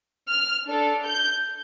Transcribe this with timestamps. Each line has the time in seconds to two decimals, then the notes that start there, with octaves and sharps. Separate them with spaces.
0.30 F6
0.67 D4 A4
1.06 G6